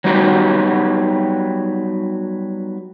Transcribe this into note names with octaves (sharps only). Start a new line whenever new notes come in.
F#3 G3 B3 D#4 F#4 G4